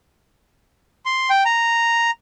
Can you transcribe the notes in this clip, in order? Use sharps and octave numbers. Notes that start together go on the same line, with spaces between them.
C6
G5
A#5